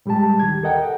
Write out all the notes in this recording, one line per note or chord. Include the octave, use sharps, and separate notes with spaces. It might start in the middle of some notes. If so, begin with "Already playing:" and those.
A2 G3 G#3 G4 A5
D2 D#3 G4 G#6
A4 A#4 D#5 F#5 G5